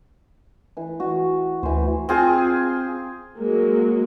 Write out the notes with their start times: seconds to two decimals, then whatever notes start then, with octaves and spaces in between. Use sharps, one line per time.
0.77 E3
1.00 F#4
1.63 D2 E3 C5
2.09 C4 F4 G#4
3.38 F#3 G#3 A#3